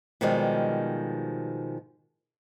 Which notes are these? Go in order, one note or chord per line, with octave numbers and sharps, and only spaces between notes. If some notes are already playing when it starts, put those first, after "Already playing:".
B2 D#3 F3 G3 G#3